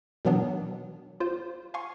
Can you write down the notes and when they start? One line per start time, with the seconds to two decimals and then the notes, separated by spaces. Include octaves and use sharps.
0.25 B2 D#3 E3 F#3 B3 D4
1.20 F4 C5
1.74 F5 G#5 C6 C#6